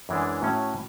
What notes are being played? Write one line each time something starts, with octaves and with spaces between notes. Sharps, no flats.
F#2 E3 G#3 D4
A2 F#3 C#4